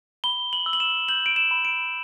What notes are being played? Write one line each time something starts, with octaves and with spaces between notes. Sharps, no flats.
B5 G7
F#7
E6
F#7
E7
G6 F#7
D7
E7
B5
D7